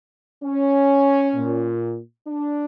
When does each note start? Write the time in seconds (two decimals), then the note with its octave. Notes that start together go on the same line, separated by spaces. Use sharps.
0.43 C#4
1.35 A#2
2.27 D4